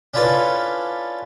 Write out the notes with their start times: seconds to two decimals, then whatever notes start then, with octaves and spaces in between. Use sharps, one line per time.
0.14 C#4 D4 E4 F4 A4 B4